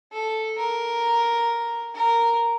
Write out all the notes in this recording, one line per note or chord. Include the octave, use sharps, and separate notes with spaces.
A4
A#4
A#4